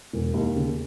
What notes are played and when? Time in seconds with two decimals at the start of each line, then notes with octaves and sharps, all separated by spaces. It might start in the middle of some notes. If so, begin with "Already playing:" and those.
0.13 E1
0.34 D#2
0.56 C#3